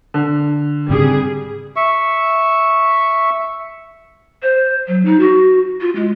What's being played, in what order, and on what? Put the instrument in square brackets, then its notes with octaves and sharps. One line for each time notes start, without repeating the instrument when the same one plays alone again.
[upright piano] D3
[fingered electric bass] G#2 C#3 C4 [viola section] G3 G#4
[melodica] E5 C#6
[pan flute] C5
F#3
D#4
F#4
F4
G#3